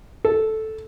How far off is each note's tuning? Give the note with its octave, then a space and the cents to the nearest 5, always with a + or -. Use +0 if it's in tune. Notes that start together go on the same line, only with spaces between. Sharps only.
A4 -5